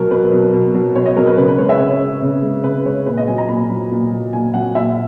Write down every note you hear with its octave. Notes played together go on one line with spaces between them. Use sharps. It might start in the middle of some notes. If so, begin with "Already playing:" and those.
Already playing: B2 F#3 A#4
B2 B4
F#3
B2
F#3
B2 C#5
D#5
F#3 A#4
B4
C#3 B4
B4
G#3 C#5
E5
C#3 C#5
G#3
C#3
G#3
C#3 B4
G#3 C#5
A#2 B4
D#5
F#3 G#5
A#5
A#2 B5
F#3
A#2
F#3
A#2 G#5
F#3 F#5
A#2 E5